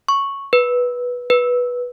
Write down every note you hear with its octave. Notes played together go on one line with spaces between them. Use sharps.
C#6
B4
B4